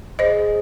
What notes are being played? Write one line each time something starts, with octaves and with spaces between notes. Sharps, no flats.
G#4 C5 D#5